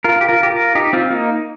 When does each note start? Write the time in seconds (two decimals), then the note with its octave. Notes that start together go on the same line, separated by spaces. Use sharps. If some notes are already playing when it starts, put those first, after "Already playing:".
0.04 F4 A#4
0.21 G4
0.29 F4 A#4
0.43 G4
0.52 F4 A#4
0.75 D#4 G4
0.93 C4 F4
1.11 A#3 D#4